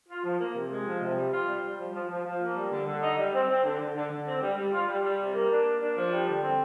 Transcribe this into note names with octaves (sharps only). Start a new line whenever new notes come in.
F4
F3
A#3
C3
G#3
F3
C3
G3
F4
G3
G3
F3
F3
F3
F3
A#3
G3
D3
D3
D#4
G3
C4
C4
D3
D3
D3
D3
C4
G3
G3
F4
G3
G3
C3
A#3
D4
A#3
D4
F3
G3
D3
C4